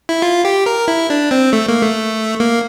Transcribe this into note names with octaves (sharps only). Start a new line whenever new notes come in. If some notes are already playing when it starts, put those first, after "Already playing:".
E4
F4
G4
A#4
E4
D4
C4
A3
A#3
A3
A#3